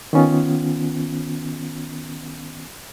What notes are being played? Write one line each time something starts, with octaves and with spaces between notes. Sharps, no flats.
D#3 B3 C#4 F4